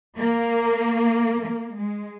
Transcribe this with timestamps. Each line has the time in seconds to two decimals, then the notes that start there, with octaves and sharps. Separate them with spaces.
0.17 A#3
1.43 A#3
1.75 G#3